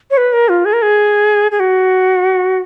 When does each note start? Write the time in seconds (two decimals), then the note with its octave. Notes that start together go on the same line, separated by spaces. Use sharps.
0.10 C#5
0.17 B4
0.33 A#4
0.49 F4
0.65 G#4
0.73 A#4
0.82 G#4
1.51 G#4
1.60 F#4